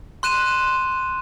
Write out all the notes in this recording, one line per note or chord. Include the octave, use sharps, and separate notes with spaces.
C6 F#6 D#7 E7